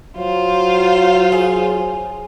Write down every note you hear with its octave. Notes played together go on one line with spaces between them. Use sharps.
F#3 F4 C5
G#4